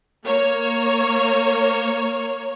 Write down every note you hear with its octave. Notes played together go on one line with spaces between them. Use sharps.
A#3 C#5